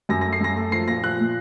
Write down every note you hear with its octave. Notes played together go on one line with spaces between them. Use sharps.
F#2 A#6
A3 A#6
C7
F#2 A#6
A3
F3 C7
A#2 A#6
F3 F#6
A#2